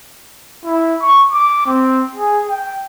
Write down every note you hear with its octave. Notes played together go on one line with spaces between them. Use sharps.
E4
C#6
D6
C4
G#4
G5